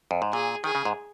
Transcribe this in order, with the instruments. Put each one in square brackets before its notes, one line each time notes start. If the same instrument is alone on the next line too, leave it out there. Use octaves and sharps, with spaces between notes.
[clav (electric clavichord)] F2
G#2
[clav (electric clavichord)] A#2 [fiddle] G#4
[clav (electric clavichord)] D#3 [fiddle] G#4
[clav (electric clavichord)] C#3
G#2